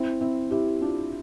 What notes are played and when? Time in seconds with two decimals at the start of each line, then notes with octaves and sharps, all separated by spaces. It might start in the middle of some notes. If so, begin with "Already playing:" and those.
Already playing: C4 E4
0.21 C4 E4
0.51 E4 G4
0.82 D4 F4